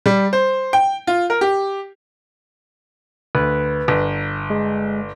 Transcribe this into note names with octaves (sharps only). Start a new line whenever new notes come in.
G3
C5
G5
F4
A#4
G4
D2 B4
G1
G#3